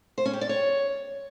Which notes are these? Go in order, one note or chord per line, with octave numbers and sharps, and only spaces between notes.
C5
C#4
G4
D5
C#5